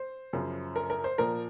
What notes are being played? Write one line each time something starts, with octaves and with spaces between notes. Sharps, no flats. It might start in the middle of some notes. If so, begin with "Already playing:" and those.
Already playing: C5
F#2 C#3 F3
A#4
A#4
C5
A#2 F3 A#4